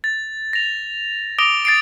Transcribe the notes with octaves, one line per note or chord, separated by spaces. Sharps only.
A6
A#6 F7
D6 D#6 A#6 D7 F7 G7
A6 C7 D7